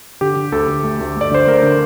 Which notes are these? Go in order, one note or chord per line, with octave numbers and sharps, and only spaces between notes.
D3 G4
D3
D2 A4
D2
A3
D2
A3 D5
D3 C5
A3 A#4
D3